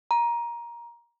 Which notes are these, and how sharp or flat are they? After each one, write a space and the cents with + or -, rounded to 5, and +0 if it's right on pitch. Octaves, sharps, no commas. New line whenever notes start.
A#5 +15